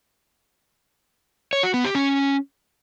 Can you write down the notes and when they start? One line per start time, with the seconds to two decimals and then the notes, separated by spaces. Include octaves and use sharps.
1.53 C#5
1.63 F#4
1.74 B3
1.84 G4
1.95 C#4